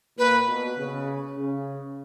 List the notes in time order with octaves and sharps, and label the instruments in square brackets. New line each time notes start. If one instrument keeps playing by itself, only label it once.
[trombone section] A#2 [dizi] B4
[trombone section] B2
C#3
C#3